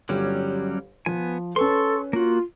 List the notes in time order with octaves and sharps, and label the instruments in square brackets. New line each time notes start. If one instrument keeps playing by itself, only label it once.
[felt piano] G1 G4 [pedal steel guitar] F#3 G3 C#4
[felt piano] F3 [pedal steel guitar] B3 G#5
[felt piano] C#4 B4 [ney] A4 [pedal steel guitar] C6 C#6
[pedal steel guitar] A#3 F#4 [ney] F4